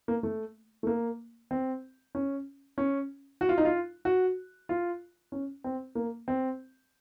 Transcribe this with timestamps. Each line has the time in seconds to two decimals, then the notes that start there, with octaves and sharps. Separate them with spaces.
0.08 A#3
0.23 A3
0.83 A3
0.87 A#3
1.51 C4
2.15 C#4
2.78 C#4
3.41 F#4
3.49 F4
3.58 D#4
3.65 F4
4.05 F#4
4.69 F4
5.32 C#4
5.64 C4
5.95 A#3
6.28 C4